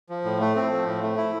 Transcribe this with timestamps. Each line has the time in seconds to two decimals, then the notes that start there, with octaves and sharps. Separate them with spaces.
0.09 F3
0.24 A2
0.40 A3
0.55 C4
0.71 F3
0.87 A2
1.03 A3
1.17 E4